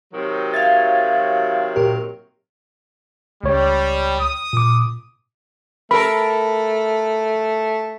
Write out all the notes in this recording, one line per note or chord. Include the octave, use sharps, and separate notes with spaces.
C3 D#3 F#3
E5 F5 G#6 A6
A#2 G4 A#4
C#2 G3 C#5
D#6
A#2 D6
A3 A4 A#4 B5